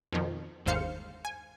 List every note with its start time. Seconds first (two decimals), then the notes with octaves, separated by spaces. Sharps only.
0.12 F2 B2 D#3 F3
0.66 G1 D#2 G#2 C5 F5 C#7
1.25 G#5